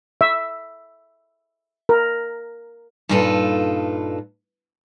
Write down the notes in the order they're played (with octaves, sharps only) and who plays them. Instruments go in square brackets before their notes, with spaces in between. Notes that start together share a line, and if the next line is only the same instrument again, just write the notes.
[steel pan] E5
A#4
[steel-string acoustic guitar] G2 A#2 D#4 F4 A4 B4